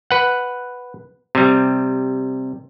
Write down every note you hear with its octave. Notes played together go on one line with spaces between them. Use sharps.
B4 F#5
C3 G3